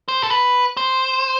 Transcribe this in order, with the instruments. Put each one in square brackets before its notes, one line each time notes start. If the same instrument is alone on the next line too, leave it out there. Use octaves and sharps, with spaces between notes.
[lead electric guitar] C5
A4
B4
C5